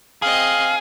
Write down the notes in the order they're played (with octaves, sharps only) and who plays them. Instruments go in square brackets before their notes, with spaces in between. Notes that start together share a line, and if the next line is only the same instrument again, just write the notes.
[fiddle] C4 D#5 [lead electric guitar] G#4 [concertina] F5